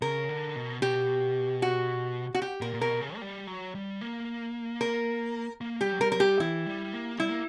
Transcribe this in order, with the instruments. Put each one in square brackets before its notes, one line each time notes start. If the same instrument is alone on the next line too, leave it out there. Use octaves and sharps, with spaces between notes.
[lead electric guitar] C#3 [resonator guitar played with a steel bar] A#4
[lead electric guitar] D3
B2
[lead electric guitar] B2 [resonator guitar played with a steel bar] G4
[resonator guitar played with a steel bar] F#4
F#4
G4
[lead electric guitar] A#2 [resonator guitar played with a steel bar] A#4
[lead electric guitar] A#2
[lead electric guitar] B2 [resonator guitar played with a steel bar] A#4
[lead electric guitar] C#3
A#3
G3
F#3
G3
A#3
[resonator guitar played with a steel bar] A#4
[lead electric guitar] A#3
[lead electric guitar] G3 [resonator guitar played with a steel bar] G4
[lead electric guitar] F#3
[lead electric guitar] G3 [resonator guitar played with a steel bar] A#4
[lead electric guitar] F#3 [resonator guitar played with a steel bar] A#4
[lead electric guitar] G3 [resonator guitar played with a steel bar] G4
[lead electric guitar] E3 [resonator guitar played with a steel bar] E4
[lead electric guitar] G3
A#3
[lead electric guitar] G3 [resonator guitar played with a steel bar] E4
[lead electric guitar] A#3